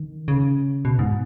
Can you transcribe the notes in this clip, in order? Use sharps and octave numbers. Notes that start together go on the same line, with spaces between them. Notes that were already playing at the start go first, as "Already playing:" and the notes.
Already playing: D#3
C#3
B2
G#2